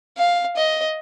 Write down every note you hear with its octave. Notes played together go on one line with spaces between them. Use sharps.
F5
D#5